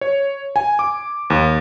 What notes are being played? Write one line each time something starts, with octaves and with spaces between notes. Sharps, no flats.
C#5
G#5
D6
D#2